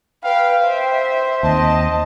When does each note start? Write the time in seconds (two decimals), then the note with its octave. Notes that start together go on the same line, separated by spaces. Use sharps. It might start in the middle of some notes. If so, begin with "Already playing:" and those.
0.24 B4 F5 G5
0.63 C5 E5
1.43 D#2 C4 D#5 A5